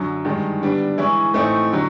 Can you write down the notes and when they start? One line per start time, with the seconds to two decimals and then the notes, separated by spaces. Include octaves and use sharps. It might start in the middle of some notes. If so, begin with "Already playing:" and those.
Already playing: F#2 D3 F#3
0.25 G2 D#3 G#3
0.61 D3 G3 B3 D4
0.98 E3 G#3 C#4 E4
1.33 A2 E3 A3 C4 D#4
1.72 D3 F#3